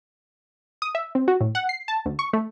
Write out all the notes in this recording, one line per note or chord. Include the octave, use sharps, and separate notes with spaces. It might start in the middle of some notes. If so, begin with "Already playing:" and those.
D#6
E5
C4
F#4
A2
F#5
C7
A5
D2
C#6
A3